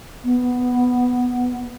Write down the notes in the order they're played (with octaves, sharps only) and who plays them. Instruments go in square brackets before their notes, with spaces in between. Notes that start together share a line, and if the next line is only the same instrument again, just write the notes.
[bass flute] B3